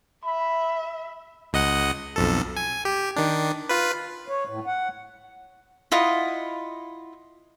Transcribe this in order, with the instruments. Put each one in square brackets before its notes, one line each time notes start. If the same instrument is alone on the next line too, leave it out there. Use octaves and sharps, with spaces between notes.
[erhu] E5 [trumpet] B5
[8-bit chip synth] C#2 D#5 F#5
B1 F2 A4
G#5
G4
D#3 D4
F4 B4
[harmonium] C#5
A2
F#5
[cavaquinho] E4 F4 D#5 F#5